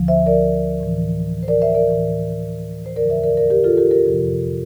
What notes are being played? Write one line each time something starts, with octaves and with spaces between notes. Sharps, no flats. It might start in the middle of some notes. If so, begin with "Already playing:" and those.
Already playing: D2 D3 F3
C5 E5
A#4 D5
A2 E3
C5
A#4 D5
C5 E5
A#4 D5
A2 E3
C5
E2 D3 F3 A#4 D5
C5 E5
A#4 D5
A#4 D5
G4 A#4
F4 A4
G4 A#4
G4 A#4
F2 C3 F3